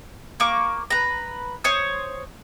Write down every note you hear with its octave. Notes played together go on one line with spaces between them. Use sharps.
A#3 C#6 D6
B4 A#5
C5 C#5 D#6